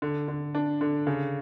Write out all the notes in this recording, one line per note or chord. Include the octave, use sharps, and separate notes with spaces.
D3
D3
D4
D3
C#3